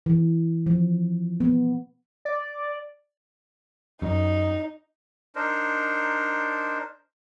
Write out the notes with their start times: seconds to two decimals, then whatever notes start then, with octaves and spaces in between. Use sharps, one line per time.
0.06 E3
0.66 F3
1.40 B3
2.25 D5
4.02 F#2 D#4
5.36 D4 D#4 A#4 C5